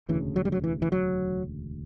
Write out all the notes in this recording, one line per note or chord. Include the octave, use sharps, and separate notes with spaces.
E1 D2 C#3 E3
F#3
G3
F#3
E3
E3
F#3